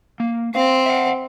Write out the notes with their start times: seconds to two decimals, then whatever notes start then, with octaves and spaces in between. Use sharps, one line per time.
0.20 A#3
0.55 C4 F5
0.86 E5 F#5